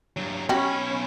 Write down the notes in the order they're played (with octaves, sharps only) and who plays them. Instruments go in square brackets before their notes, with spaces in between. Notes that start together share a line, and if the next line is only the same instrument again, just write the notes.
[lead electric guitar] G2 F#3
[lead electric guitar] B1 B5 [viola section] C#4 [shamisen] F#4 G4